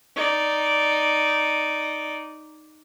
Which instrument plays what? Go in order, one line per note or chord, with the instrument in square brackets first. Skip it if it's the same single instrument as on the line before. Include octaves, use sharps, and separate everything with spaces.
[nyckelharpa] D#4 D5